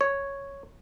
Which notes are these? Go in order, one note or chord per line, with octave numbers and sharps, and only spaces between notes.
C#5